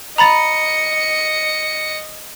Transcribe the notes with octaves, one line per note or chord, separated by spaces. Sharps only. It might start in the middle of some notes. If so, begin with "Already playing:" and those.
D#5 A#5 B5 A6 C#7